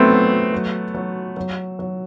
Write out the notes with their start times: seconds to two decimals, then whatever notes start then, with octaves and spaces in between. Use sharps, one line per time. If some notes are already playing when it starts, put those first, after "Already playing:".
Already playing: F#3 A3 B3 C4
0.11 F#3
0.53 F#3
0.95 F#3
1.37 F#3
1.79 F#3